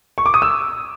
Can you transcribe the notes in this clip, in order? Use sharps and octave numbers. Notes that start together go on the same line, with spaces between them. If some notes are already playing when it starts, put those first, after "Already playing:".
C#6
D6
D#6
E6